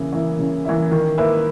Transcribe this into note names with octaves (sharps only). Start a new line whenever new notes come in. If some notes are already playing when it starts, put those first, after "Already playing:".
Already playing: C#3 E3 A#3 E4
E3 A#3 E4
C#3
E3 A#3 E4
D#3
A#3 E4 B4